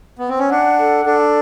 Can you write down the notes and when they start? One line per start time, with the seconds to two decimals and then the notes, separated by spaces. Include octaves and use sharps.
0.19 B3
0.29 C4
0.39 C#4
0.50 D4 F#5
0.78 A4
1.06 D4 A4